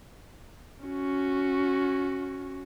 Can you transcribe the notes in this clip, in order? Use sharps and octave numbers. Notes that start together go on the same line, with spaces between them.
C#4 F#4